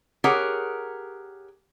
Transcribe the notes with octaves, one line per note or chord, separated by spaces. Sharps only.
G4 G#4 A#4 C#5 F#5